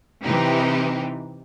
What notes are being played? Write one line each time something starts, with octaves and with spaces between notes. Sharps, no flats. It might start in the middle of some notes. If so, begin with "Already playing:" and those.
C3 E3 D#4 G4